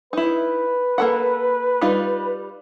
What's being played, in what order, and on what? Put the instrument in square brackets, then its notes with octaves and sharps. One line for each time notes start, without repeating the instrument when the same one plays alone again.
[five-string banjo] D#4 E4 [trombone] B4
[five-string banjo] A#3 A4 F#5
G3 D#4 F4